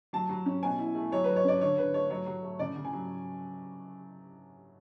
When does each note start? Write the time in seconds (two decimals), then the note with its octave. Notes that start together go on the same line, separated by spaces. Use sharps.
0.13 F#3 A5
0.29 F#3
0.46 C#4
0.63 B2 G#5
0.79 E4
0.95 A3
1.12 F#3 C#5
1.24 F#3 B4
1.36 C#5
1.44 C#4 D5
1.61 D3 C#5
1.78 D3 B4
1.94 A3 C#5
2.10 F#3 C#5
2.26 F#3
2.43 A3
2.59 C#3 D5
2.76 C#3
2.85 G#5
2.93 F#3